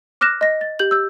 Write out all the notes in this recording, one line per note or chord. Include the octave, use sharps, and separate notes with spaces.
D6 F6 F#6 A#6 E7
D#5 A#6
A6
G4 G6 F#7
E6 G6